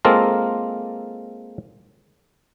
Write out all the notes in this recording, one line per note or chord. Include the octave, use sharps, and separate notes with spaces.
G#3 A#3 C4 F4 A4 A#4